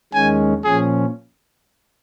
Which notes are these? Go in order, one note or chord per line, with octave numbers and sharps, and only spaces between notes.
D#2 D#3 G#3 C#4 G#5
A#2 F3 C#4 G#4